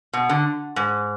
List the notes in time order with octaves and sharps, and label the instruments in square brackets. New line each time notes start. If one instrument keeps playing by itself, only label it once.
[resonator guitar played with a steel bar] B2
D3
G#2